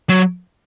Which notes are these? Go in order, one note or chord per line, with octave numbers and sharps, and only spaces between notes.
F#3